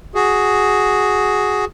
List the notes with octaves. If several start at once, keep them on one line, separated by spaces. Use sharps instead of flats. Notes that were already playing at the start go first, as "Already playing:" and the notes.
F#4 G#4